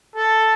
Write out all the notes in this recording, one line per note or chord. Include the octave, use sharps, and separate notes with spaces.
A4